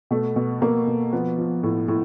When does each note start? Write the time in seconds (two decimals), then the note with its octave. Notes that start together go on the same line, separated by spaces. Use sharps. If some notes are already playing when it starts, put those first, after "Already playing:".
0.11 B2 A3
0.36 B2
0.62 B2 A#3
0.87 B2
1.13 F3 B3
1.38 F3
1.63 A2
1.88 A2